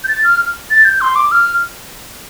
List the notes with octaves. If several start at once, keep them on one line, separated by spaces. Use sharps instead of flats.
G6
A6
F6
A6
G6
C6
D6
F6